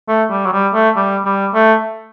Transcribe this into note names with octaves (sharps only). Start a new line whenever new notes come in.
A3
G3
F#3
G3
A3
G3
G3
A3